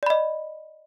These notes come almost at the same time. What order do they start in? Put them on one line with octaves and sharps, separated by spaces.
D5 B5 D#5